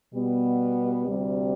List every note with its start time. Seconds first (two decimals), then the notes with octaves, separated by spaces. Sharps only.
0.13 B2 G3 B3
1.05 D2 C3 G3